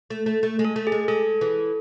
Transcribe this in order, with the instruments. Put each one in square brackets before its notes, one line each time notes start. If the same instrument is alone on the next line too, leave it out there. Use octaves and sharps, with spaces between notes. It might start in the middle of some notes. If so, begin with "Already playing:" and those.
[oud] A3
A3
A3
G#3
[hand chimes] A4
[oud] A3
[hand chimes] G#4
[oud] G#3
[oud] G#3 [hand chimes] A4
[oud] E3